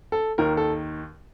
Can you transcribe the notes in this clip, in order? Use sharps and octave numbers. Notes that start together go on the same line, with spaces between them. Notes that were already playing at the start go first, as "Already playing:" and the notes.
A4
D#2 D#3 A#4
A4